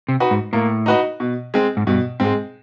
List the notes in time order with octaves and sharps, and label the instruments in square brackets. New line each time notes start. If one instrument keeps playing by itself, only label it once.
[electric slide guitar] C3
[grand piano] D#4 F#4 B4 D#5
[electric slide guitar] G#2
[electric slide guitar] A2 [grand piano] A#3
[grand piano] D#4 F#4 B4 D#5
B2
G#3 C4
[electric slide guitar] G#2
[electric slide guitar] G2 [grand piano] B2
[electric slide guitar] G#2 [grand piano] G#3 C4